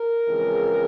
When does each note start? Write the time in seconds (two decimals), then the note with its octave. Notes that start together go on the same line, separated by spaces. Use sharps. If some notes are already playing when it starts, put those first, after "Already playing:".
Already playing: A#4
0.28 F2 C#3 E3 G#3